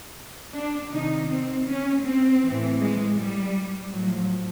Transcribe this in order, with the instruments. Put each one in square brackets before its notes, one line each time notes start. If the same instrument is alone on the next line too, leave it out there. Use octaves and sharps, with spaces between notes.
[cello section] D4
C3 D#3 D#4
C4
C#4
C4
A2 E3
G#3
G3
A2 F3 F#3